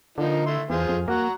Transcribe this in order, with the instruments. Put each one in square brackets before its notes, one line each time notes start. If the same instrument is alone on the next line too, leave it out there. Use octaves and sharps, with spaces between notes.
[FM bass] D3 [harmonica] F3 A#3 D#4
[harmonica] A3 E4 C6
[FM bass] E2 [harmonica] F4 G#4 C5
[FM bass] F2
[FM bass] A#3 [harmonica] F#4 F#5 A#5